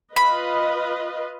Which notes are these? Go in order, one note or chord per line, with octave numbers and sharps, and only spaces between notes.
F4 B4 D#5 B5